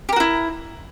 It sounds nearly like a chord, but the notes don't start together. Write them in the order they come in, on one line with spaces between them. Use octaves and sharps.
G4 A#4 F#4 E4